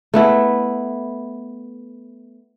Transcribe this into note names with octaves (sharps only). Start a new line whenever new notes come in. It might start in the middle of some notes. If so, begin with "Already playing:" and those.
A3 B3 E4